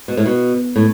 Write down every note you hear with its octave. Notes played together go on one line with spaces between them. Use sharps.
B2
A2
B2
A2